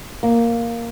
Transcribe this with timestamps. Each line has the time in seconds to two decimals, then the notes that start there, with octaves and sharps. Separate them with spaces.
0.23 A#3